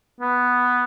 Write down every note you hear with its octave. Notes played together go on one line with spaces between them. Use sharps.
B3